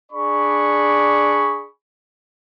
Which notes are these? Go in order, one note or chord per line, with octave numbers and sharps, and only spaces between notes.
D4 G#4 D5 B5 C#6